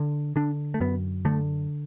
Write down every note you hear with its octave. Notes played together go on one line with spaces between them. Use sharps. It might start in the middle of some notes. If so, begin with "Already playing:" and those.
Already playing: D3
D3 D4
A3
F#2 B3
D3 A3